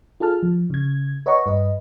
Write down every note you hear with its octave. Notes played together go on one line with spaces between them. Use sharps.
F4 G#4 A4 A5 F6
F3
C#3 G#6
B4 C#5 D#5 F#5 A#5 C#6
G2 B4 D#5